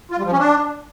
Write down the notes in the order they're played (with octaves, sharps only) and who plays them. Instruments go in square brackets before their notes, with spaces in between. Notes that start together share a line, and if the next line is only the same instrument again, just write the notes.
[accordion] F4
G3
F3
C#4
D4